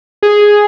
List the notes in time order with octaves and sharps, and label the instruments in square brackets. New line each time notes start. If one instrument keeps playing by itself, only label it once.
[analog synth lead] G#4